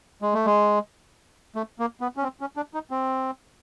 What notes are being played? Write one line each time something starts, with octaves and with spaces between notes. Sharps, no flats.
G#3
A3
G#3
A3
A#3
B3
C#4
C4
C#4
D4
D#4
C4